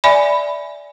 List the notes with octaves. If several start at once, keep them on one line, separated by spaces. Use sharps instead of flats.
D5 E5 G#5 B5